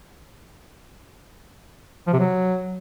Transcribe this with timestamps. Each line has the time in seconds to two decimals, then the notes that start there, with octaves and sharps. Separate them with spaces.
2.07 F3
2.13 C3
2.19 F#3